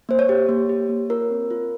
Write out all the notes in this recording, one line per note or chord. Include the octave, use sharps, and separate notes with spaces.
A#3 C5
C#5
G4
A#3
G4
A#3
F4 A#4
C4
F4